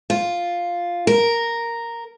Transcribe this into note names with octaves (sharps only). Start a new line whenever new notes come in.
F4
A#4